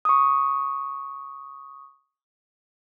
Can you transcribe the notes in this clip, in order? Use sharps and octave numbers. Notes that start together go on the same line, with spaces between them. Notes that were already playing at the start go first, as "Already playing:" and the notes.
C#6 D#6